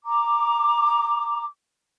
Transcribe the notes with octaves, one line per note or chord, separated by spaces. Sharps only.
A#5 D6